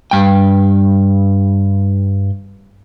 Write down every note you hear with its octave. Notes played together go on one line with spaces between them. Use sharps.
G2 G5